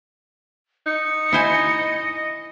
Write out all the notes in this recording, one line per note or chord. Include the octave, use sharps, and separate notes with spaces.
D#4 C#7
E4 C5 D#5 G#5